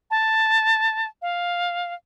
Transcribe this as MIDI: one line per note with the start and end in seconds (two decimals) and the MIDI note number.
0.11 1.07 81
1.22 1.94 77